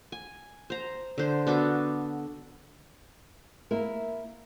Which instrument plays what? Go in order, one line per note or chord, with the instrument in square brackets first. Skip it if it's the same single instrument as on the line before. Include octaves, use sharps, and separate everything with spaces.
[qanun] G#5
C5 A#5
D3 C5
B3 D4 F#4 A4
[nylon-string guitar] A#3 E4 A#4